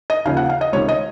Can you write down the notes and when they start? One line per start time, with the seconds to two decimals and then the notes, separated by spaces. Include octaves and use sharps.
0.10 D#5
0.25 D#2 C#3 F3 F5
0.37 F#5
0.50 F5
0.61 D#5
0.73 C#2 C3 D#3 C#5
0.89 D#5